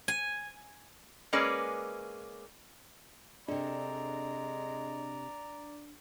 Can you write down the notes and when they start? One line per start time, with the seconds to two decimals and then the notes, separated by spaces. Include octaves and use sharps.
0.08 G#5
1.33 G#3 A#3 C#4 G#4 B4 D5
3.48 C3 G#3 D4 A4 D5 A#5